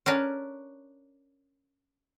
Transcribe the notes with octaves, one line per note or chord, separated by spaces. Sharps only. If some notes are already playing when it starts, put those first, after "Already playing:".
C#4 D4 A#4 B4